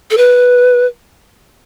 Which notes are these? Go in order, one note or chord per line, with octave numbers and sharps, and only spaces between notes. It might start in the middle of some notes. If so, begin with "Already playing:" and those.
A4
B4